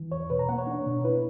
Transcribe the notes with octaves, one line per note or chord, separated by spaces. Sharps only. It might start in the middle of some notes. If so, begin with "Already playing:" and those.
Already playing: E3
E2 C#5
B2 B4
A#5
A#3 F#5
C#5
D4
B2
E4 B4